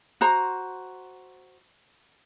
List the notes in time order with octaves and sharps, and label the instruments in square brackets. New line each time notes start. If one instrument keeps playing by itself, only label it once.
[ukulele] F#4 C5 A#5